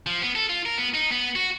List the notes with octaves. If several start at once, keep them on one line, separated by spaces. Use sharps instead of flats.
F3
B3
A4
F4
A#4
B3
D#4
B3
F#4